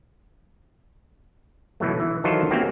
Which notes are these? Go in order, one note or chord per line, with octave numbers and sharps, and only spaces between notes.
B2 E3 F#3 A3
E3
D#3 E3 F#3 F4 A4 C5
A3 A#3 C4 C#4 F#4 G4